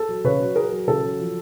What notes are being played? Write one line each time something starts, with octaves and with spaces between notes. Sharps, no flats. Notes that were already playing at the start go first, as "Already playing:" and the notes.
Already playing: A4
F#3
C#3 B4 C#5
F#3
F#3 G#4 A#4
F#3
C#3 A4
F#3
F3